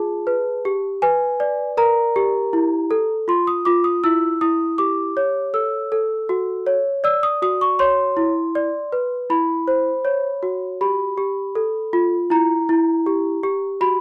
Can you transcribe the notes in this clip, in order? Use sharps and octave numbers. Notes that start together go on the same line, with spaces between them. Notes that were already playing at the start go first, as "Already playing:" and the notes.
Already playing: F4 G#4 A5
B4
G4
B4 G#5
D5
A#4 A#5
G4
E4
A4
F4 C6
D#6
F4 D6
D#6
E4 E6
E4 D#6
G4 D6
C#5
A4 E6
A4
F#4
C#5
D5 E6
D#6
F#4 D#6
C#6
C#5 C6
E4
D5
B4
E4 B5
C5
C#5
F#4
G4 B5
G4
A4
F4
E4 A#5
E4
G4
G4
F#4 B5